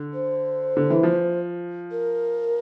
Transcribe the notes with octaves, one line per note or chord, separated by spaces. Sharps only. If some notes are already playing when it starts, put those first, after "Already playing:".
Already playing: D3
C5
D3
E3
F3
A#4